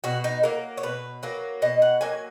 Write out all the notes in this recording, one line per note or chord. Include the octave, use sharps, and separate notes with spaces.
B2 F#4
D#4
F#3 A#3 A#4
C#5
B2 B4
F#3 A#3
B2 D#5
F#5
F#3 A#3 G#5